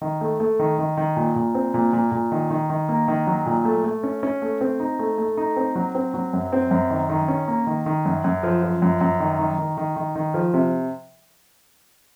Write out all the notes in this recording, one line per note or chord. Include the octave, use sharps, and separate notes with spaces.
D#3
A3
A3
D#3
D#3
D#3
A#2
A#2
C4
A#2
A#2
A#2
D#3
D#3
D#3
A#3
D#3
F#3
A#2
A3
A3
C#4
C#4
A3
C4
D#4
A3
A3
D#4
C4
F#3
C4
F#3
F#2
C4
F#2
D#3
D#3
C#4
A#3
D#3
D#3
F#2
F#2
F3
F3
F#2
F#2
D#3
D#3
D#3
D#3
D#3
D#3
F3
C3